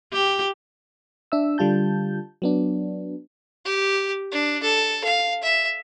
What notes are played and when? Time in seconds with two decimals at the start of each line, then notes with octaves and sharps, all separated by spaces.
0.13 G4
1.32 D4 E5 E6
1.58 D3 G3 F4 A5 G6
2.42 F#3 B3 D4
3.65 G4
4.32 D4
4.63 A4
5.04 F5
5.43 E5